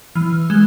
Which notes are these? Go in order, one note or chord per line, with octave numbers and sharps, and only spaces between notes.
E3 F6
G#3 F#6